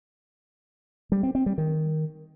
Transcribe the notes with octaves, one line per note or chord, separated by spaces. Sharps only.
G3
C4
C4
G3
D#3